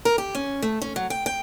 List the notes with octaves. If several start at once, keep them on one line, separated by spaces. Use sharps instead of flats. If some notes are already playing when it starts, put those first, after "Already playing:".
A#4
G4
C#4
A3
C#4
F#3
G5
G5